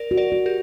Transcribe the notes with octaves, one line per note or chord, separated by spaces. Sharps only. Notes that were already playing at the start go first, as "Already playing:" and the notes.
Already playing: A#4 D5
F#4
A#4 D5
F#4
G4 A#4